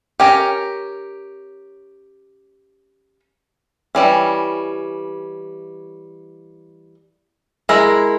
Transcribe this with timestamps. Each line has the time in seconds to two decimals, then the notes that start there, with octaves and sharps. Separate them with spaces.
0.20 C#4 G4 A#4 C#5
3.95 E3 G3 C#4
7.69 G#3 E4 A#4